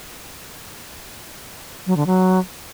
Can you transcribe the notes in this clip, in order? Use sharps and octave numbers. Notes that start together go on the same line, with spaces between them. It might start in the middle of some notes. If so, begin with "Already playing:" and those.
F#3
D3
F#3